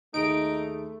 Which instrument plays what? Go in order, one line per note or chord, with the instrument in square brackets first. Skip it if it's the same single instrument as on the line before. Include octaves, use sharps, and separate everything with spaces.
[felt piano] D#2 G#4 [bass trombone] A3 [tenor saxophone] D#4 [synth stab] D7